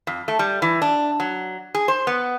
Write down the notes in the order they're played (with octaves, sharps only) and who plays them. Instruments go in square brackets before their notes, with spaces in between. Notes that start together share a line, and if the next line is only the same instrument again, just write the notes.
[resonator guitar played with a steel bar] F2
A3
G3
E3
D4
F#3
G#4
C5
B3